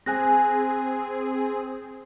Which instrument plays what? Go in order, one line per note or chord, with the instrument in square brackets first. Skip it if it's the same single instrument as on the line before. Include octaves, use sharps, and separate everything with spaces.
[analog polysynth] C4 G#4 [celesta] G#5 F#6 A#6